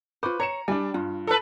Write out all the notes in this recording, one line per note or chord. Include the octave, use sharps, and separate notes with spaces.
F4 B4 C5 C#6 D6
C#5 A#5 C#7 E7
G3 D4 G#5
G2 F4
A4 B4